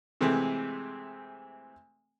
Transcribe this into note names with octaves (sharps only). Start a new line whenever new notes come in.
C3 E3 G#3 A3 C4